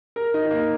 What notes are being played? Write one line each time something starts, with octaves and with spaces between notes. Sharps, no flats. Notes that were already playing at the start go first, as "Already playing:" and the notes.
A#4
D#4
A#3